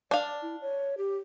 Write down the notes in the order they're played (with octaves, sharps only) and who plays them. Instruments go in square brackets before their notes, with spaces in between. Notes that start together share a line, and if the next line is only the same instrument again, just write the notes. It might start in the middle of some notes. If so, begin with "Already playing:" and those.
[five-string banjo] D4 F5 [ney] D5
[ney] E4
C#5
G4